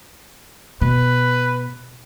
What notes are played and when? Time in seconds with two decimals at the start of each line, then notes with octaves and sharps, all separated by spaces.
0.81 B2 B4